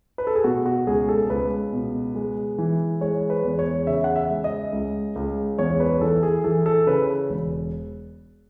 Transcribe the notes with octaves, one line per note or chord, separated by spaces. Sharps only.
B4
A4
G#4
B2 F#4
F#4
C#2 G#4
A4
A4
C#2 B4
B2
G#3
E3
G#3 C#5
B4
E2
C#5
C#3 E5
F#5
E5
G#3
D#5
C#2
C#2
E2 C#5
B4
E3 A4
G#4
E3 A4
A4
C#3 B4
E1